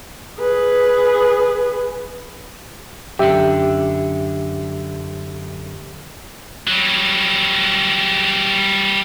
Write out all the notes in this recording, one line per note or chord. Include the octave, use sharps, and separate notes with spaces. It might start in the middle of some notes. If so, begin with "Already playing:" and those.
G#4 B4
F#2 D3 G4 E5
F#3 G3